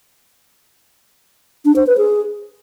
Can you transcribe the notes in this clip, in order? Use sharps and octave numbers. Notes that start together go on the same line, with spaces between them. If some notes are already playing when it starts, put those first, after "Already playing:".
D4
C5
B4
G#4